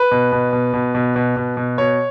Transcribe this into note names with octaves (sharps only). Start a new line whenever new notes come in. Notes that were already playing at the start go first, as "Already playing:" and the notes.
Already playing: B4
B2
B2
B2
B2
B2
B2
B2
B2
B2 C#5